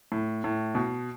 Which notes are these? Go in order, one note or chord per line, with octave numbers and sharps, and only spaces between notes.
A2
A2
B2